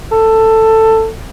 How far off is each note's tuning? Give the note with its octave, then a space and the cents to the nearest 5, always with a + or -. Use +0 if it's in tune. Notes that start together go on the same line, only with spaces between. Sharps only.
A4 +15